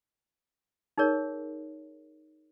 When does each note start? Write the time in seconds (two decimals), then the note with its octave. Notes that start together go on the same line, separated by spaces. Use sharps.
0.98 D#4 G#4 A#4 C#5